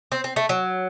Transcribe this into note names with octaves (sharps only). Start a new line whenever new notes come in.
C4
C4
A3
F#3